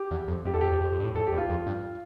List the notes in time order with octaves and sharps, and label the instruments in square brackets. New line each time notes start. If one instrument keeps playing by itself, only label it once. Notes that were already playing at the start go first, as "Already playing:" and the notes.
Already playing: [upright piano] G4
[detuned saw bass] E2
F2
[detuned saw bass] F2 [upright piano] G4
[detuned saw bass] E2 [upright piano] A4
[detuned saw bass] F2 [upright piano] G4
[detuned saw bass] E2
F2
F2
G2
A2
[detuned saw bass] F2 [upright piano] A4
[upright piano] G4
[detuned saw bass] E2
[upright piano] F4
[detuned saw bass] F2
G2